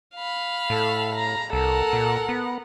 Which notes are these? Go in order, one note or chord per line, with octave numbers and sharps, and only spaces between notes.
F5 B5
A2 A4
A#5
C2 A4 A#4 F#5
A#2
B3